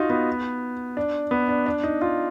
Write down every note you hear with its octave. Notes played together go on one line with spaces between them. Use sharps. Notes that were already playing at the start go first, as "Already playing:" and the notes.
Already playing: D#4 F4 F#4
B3
D4
B3
D4
D4
D#4
F4